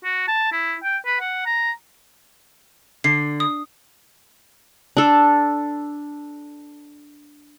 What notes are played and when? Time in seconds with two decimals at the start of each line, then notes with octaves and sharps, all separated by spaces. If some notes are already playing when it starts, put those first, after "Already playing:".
0.04 F#4
0.28 A5
0.52 E4
0.83 G5
1.06 B4
1.21 F#5
1.46 A#5
3.04 D3 C7
3.40 D#6
4.97 D4 A4